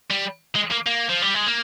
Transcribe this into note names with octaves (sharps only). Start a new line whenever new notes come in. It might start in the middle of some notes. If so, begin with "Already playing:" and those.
G3
G#3
A#3
A#3
F3
G3
G#3
A#3